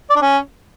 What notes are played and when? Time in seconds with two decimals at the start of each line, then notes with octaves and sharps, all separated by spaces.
0.10 D5
0.15 D4
0.21 C#4